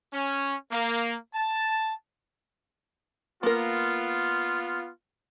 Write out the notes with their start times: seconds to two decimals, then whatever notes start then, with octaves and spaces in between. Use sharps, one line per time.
0.12 C#4
0.71 A#3
1.34 A5
3.43 A#3 B3 F4 A#4